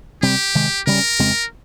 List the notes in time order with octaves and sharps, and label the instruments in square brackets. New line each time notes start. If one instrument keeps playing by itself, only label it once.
[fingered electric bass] C3 G3 C4 [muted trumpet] G4
[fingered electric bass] C3 D#3 G#3
[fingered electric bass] C#3 G3 C#4 [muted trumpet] A#4
[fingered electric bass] F2 C#3 G#3 C4